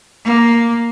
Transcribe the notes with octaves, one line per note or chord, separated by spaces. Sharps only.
A#3